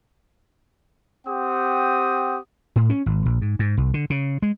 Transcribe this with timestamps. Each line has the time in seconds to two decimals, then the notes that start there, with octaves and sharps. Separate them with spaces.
1.27 C4 G4 F#5 D#6
2.76 A2
2.90 C#4
3.06 G#1
3.26 A#1
3.41 G#2
3.59 G#2
3.77 C2
3.94 D3
4.10 C#3
4.42 G#3